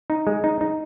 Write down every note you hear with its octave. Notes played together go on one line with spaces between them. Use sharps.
D#4
G#3
D#4
D#4